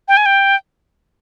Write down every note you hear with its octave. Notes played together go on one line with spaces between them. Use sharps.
G5
G#5
G5